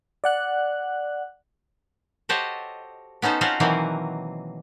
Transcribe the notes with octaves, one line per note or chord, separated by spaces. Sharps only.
D5 F#5 F#6
F#4 G4 A4 C5 C#5 D#5
B3 C#4 D#4 A4 C5
C4 C#4 F4 F#4 A4 C5
B2 D#3 E3 F#3 A#3 C4